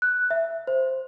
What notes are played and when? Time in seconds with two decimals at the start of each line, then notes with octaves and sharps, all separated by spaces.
0.02 F#6
0.30 E5
0.67 C5